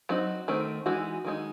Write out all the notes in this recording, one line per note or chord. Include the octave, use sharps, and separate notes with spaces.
F#3 C4 D#4 F#4
D#3 A3 C4
E3 G#3 D#4 F#4
D#3 G#3 D#4